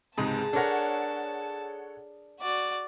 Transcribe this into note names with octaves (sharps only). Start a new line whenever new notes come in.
C#2 G#2 C3 G#4 A5
D4 A4 A#4 C#5 F#5
F#4 D5